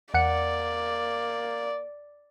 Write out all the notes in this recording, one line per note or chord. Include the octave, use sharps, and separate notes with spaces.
E2 A#3 D5 F#5 C#7